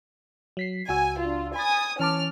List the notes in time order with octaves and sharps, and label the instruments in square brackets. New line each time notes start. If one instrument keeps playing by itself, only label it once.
[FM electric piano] F#3 B6 C7
[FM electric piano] C#2 F#4 E6 [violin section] G#5
[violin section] D4 F4
[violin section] G#5 D#6 [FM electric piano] B5 A6
[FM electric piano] E3 A5 D6 [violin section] C#4 F6